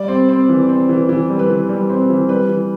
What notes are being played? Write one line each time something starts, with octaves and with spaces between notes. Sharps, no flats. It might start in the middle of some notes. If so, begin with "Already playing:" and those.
Already playing: G3 D5
C4
C4
E3
C4
E3
E3
G3
B4
E3
G3
C4
E3
G3 B4
E3